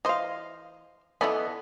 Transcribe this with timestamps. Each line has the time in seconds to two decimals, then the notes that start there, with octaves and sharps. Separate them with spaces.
0.05 E3 C5 D#5 F5
1.21 E3 B3 E4 A4 D5 D#5 G#5 B5